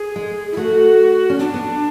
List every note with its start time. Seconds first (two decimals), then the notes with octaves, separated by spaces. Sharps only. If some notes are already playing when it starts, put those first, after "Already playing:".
Already playing: G#4
0.16 G#3
0.52 E4
0.57 A3 F#4
1.30 C#4
1.39 B3 D4
1.54 B3